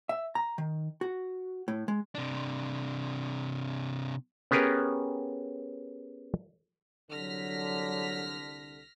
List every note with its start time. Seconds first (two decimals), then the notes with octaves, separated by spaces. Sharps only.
0.09 E5
0.35 A#5
0.58 D#3
1.01 F#4
1.68 A2
1.88 G#3
2.15 C3 D4
4.51 B3 C#4 G4 G#4 A#4 B4
7.11 C2 D3 F#3 F6 A#6 B6